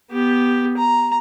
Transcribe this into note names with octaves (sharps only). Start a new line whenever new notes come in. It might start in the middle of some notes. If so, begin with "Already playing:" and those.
B3 G4
A#5